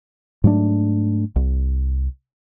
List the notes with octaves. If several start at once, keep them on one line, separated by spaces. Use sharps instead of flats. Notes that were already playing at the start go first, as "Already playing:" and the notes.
G#2 F#3 A3 D4
C2